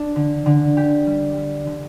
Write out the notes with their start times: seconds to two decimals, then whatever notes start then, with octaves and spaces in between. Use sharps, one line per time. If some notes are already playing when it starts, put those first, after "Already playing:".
Already playing: D4
0.16 D3
0.46 D3
0.77 G4
1.07 G3
1.37 G3
1.67 D3